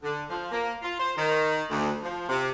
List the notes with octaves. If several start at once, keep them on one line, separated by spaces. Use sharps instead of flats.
D3
F3
A#3
F4
C5
D#3
D2
F3
C3